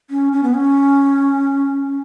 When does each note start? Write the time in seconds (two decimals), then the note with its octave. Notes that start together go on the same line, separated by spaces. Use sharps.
0.10 C#4
0.33 C#4
0.43 B3
0.54 C#4